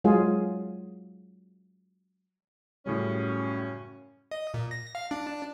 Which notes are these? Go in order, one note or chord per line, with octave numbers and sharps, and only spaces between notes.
F#3 G#3 F4 G#4
F#2 A2 C#3 G3 C#4
D#5
A#2
A#6
F5
D4